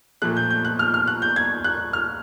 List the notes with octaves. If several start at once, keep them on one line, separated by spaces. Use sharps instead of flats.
A#2 F3 A3 F#6
G6
G6
F#6
F6
F6
F#6
G6
G#6
F#6
F6